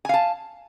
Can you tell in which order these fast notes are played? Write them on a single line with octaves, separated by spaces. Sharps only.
G#5 F5 A5